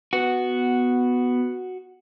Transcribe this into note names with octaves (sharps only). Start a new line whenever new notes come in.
B3 F#4